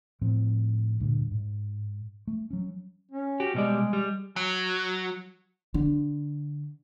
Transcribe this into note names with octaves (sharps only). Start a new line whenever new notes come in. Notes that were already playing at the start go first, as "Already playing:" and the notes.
A2 F3 C4
D2 G2 A#2 D3
G#2
A3
F#3 C#4
C#4
F#4 G4
B2 G3 G#3 D5
G3
F#3
D3